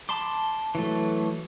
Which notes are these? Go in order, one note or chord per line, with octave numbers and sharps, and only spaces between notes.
A5 B5 C6 D6
E3 F#3 A3